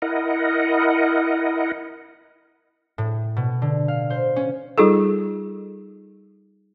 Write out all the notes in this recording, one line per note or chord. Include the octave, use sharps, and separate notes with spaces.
E4 A#4 D#5 F#5
A2
B2
D3
F5
C5
C#4
G3 D#4 F4 G#4 A4